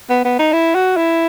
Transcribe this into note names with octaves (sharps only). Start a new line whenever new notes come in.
B3
B3
D#4
E4
F#4
E4